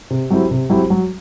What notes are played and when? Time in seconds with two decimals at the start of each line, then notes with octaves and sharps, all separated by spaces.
0.10 C3
0.30 F#3 C4 E4 G4
0.51 C3
0.70 F#3 C4 E4 G4
0.90 F#3